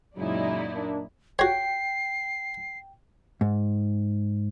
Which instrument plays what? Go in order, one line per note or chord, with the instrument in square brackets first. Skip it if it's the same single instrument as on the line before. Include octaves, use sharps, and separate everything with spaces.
[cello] F#2 A#2 [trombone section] C#3 F#3 G#3 [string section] D#4 E4 D5
[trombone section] A#3 D4
[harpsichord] F#4 C#5 [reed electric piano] G5 [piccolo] C7
[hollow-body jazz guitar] G#2